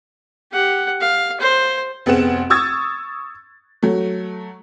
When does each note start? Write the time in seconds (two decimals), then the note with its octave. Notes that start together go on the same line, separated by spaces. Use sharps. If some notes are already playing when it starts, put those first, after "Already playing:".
0.52 G4 F#5
1.01 F5
1.40 C5
2.06 F1 B3 C4 G#4 F#5 E7
2.50 C#6 D#6 E6 G#6 A6
3.83 F#3 A3